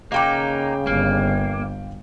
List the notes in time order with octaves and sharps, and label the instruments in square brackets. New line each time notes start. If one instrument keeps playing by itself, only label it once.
[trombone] C#3 [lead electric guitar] A#3 D#4 [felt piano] F5 G5 D6
[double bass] G1 [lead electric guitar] A#3